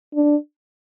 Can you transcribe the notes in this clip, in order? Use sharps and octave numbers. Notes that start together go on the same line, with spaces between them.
D4